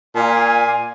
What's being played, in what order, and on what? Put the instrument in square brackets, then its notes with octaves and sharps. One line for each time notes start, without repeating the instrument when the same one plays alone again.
[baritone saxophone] A#2 [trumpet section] D5 F5 G#5